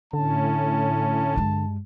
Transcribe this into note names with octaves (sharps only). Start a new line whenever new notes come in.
A2 D3 C#4 A5
G2 G#3